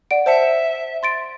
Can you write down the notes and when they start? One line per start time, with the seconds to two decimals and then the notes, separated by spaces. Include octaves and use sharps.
0.11 D5 F#5 D7
0.26 C5 E5 A5 C#7
1.03 C6 A6 D7